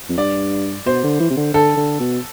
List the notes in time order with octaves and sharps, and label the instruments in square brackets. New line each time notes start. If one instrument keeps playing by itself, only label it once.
[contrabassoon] F2
[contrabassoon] G2 [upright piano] D5
[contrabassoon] B2 [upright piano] C5
[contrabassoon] D3
E3
C3
D3
[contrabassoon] D3 [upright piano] A4
[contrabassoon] D3
B2